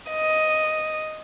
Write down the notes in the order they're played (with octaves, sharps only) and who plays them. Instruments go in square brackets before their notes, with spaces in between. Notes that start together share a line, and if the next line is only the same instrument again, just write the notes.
[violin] D#5